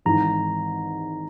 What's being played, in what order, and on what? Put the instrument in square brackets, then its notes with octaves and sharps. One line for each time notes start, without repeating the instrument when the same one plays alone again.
[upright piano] G#1 G#2 E3 [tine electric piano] A#5